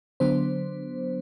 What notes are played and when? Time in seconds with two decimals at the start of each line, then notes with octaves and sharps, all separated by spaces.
0.20 D3 F#3 B3 D4 C5